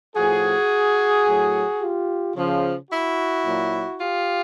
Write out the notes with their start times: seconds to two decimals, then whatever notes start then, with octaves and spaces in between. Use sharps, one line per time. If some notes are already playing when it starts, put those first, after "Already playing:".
0.16 A2 F3 F#4 G#4
1.26 A2 F#3
1.81 F4 G4
2.36 C#3 F3
2.90 E4 F#4
3.46 A#2 F#3
4.00 F4 G4